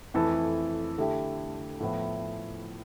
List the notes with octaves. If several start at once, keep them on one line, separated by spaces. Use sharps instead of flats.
F2 E3 A3 E4 A4
D3 A3 E4 G4
A2 F3 B3 E4